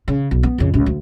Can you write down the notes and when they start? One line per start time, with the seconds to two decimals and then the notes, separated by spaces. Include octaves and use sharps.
0.08 C#3
0.31 B1
0.43 B3
0.58 F2 C#3
0.74 C#2 C3
0.86 D2